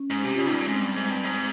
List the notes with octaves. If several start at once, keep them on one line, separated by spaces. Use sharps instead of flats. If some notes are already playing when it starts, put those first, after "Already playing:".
Already playing: C#4
G#2
C3 G4
C#3 F4
D#4
G2
A#2 C#4
G#2 C4
G2
G#2
G2
G#2